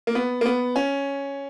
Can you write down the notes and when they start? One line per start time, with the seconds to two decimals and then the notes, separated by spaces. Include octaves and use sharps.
0.07 A#3
0.15 B3
0.41 A#3
0.46 B3
0.76 C#4